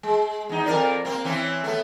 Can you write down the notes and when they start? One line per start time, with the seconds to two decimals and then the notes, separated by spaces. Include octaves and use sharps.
0.03 G#3
0.49 E2 D#4
0.66 F2 A#4 D5
1.05 A#3 C4
1.25 E3 C4 C#4
1.64 A3 B3